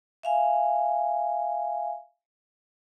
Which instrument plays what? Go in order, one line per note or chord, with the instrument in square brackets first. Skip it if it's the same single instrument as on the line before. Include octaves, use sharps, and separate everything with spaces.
[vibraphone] E5 F5 G#5